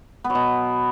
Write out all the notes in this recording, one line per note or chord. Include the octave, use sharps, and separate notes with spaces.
B3
F#3
B2